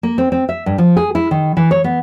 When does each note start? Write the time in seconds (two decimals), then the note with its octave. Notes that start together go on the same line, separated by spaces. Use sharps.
0.03 A#3
0.18 C4
0.32 C4
0.49 E5
0.66 G2
0.78 F3
0.97 G#4
1.15 E4
1.31 D#3
1.57 E3
1.71 C#5
1.84 B3